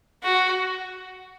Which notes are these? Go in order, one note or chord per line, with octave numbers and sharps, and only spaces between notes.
F#4